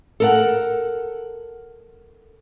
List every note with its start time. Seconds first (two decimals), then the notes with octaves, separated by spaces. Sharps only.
0.20 A4 A#4 F#5